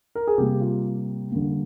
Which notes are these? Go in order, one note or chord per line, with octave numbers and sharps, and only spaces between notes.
A#4
G#4
C3 G3 A#3 G4
F4
D3 G3 A#3